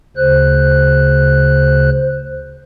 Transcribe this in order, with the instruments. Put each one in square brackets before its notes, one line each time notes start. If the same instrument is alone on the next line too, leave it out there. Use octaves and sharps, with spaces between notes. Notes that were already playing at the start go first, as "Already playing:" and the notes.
[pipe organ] D2 C#3 C5 F#6